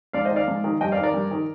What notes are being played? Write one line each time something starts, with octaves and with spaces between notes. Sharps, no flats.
G#2 D5 F5
C5 D#5
D#3
D5 F5
G#2
D#3
G2 D#5 G5
D5 F5
D#3
A#4 D5
G2
D#3